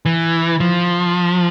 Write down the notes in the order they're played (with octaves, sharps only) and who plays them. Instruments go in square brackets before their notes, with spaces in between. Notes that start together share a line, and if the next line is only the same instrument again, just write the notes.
[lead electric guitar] E3
F3